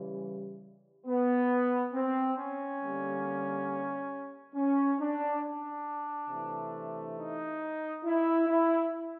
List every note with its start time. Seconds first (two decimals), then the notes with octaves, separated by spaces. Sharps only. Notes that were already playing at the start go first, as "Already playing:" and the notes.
Already playing: C#3 E3 G3
1.07 B3
1.94 C4
2.37 C#4
2.82 D3 G3 A#3
4.55 C#4
5.00 D4
5.44 D4
6.30 C3 E3 A3
7.18 D#4
8.05 E4
8.48 E4